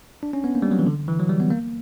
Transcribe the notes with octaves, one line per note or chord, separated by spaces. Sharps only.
D4
C#4
B3
A#3
G3
F#3
E3
D3
E3
F#3
G3
B3
A#3